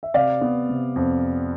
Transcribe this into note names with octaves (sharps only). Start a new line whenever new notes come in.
E5
C3 D5 F5
B3
C3
F2